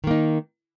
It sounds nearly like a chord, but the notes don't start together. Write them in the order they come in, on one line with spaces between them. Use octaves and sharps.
D#3 A#3 D#4